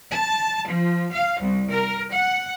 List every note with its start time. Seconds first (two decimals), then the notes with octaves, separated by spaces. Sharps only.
0.11 A5
0.67 F3
1.11 F5
1.40 C2
1.70 A#4
2.12 F#5